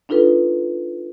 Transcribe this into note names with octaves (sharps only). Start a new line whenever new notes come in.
D4 D#4 F4 A4 B4